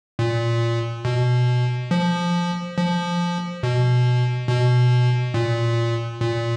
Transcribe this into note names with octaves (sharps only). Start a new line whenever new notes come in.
A#2
B2
F3
F3
B2
B2
A#2
A#2